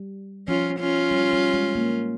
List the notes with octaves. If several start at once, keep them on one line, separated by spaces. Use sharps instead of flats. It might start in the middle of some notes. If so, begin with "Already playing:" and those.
Already playing: G3
F3 C#4 F4
C#4 F4
G3
G3
G#3
A#3